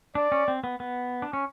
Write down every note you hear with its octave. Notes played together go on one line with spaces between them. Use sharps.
D4 D5
C#4
C4
B3
B3
D4
C#4